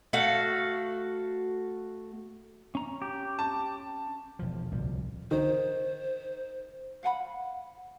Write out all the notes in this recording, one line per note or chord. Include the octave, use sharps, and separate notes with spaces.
A3 F#4 A4 F5
C#4 A#5
G4
A5
E1 F3
D1 C2 F3 G3
D#3 C5
F5 F#5 G#5 B5